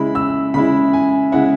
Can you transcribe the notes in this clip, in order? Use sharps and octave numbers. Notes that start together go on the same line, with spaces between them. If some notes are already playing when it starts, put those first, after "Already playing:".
Already playing: C#3 G#3 E4 B5
E6
C#3 G#3 E4 B5
G#5
C#3 G#3 E4 F#5